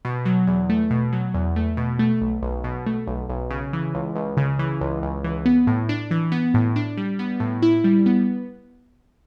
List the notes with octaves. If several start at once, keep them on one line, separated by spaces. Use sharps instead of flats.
B2
F#3
E2
A3
B2
F#3
E2
A3
B2
A3
B1
B1
B2
A3
B1
B1
C#3
E3
C#2
C#2
C#3
E3
C#2
C#2
E3
B3
A2
D4
E3
B3
A2
D4
G3
B3
A2
E4
G3
B3